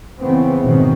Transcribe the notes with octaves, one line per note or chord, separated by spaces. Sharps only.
C#3 E3 B3 C4
F1 G#2 B2 D#3 C4